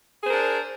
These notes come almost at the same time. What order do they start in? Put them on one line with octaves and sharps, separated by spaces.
G#4 C5 A#4 D4